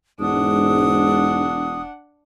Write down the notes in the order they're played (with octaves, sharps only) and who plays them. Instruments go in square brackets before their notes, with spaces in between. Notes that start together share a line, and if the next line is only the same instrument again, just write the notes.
[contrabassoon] E1 [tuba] G#2 [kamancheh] D4 F#5 [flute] D#6